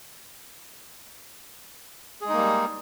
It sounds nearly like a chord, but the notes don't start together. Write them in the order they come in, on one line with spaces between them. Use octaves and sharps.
G#4 G#3 D#4 A#3 G3